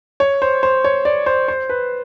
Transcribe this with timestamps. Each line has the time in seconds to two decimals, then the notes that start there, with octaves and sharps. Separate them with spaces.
0.20 C#5
0.42 C5
0.63 C5
0.84 C#5
1.05 D5
1.26 C5
1.48 C5
1.69 B4